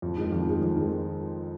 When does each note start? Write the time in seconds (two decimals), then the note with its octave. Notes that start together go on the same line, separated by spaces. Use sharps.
0.02 F2
0.17 D#3 G#3
0.32 F2
0.47 D#3 G#3
0.62 F2
0.76 D#3 G#3